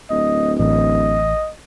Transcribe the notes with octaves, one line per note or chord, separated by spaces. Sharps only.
D1 D#5
A1 D#5